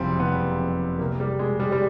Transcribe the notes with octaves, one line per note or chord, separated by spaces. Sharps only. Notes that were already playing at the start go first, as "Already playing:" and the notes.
Already playing: F#1 F2 C3 G3 C4
F#1 B3
F2 C3
C2 A#3
G3
B2 G#3
G3
G3